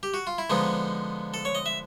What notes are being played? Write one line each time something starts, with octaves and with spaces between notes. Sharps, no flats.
G4
F#4
F4
E4
D3 F3 G#3 B3 D#4
A4
C#5
D#5
E5